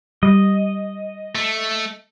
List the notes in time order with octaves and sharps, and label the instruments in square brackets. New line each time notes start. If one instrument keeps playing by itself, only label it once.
[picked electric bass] G3 [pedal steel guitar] D#5
[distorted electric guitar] A3